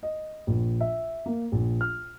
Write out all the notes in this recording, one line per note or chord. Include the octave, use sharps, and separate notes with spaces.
D#5
A#1
E5
A#3
A#1
F6